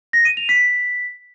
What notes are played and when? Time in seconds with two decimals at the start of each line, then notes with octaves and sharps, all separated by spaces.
0.13 A#6
0.25 D#7
0.37 F7
0.49 B6